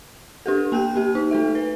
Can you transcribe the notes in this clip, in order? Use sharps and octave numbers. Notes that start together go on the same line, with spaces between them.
D4 G4 A4
A#3 G5 F#6 G6
A#3 G4
D#4
A3 A4 E5
B4